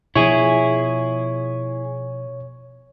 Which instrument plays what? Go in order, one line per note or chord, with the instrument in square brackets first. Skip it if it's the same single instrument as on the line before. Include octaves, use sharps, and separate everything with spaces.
[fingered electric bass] B2 F3 [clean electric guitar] E4 G#4 [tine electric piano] C#5